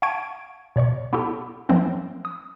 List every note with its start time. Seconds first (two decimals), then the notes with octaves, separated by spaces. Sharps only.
0.02 F5 F#5 A5 C#6 G#6 D7
0.76 B2 C#5 D5 C#6
1.13 B3 E4 F#4 G4 A4
1.69 F3 F#3 A3 A#3 C4 C#4
2.25 D#6